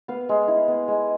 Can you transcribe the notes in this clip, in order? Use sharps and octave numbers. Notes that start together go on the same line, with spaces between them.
B3 F5
G#3
E4
B3
G#3